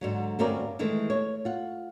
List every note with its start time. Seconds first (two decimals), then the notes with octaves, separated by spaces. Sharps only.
0.01 G#2 D3 F#3
0.39 D2 G2 C4 C#4 A#4 D5
0.79 D#3 E3 G#3 A3
1.10 C#5
1.45 F4 F#5